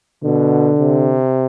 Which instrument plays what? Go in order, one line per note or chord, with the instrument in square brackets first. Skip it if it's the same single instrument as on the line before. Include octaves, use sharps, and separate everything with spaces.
[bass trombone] B2 [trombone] D3
[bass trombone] C3